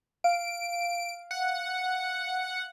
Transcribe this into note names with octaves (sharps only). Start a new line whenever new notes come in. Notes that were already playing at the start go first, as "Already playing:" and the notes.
F5 D7
F#5